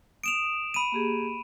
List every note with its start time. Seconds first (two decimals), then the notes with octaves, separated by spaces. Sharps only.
0.24 D#6 D7 E7 F7
0.74 B5 D#7
0.92 A#3 G4 G#4